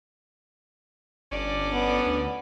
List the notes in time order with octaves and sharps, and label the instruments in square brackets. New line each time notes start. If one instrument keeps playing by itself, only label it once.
[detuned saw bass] G1 [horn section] C#4 D4 D5
[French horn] B3
[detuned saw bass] D2